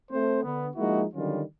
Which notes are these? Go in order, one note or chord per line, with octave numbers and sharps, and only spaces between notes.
A3 C4 C5
D3 B3
F3 G#3 A#3 D#4 E4 F#4
D3 D#3 F#3 G3 C#4 F4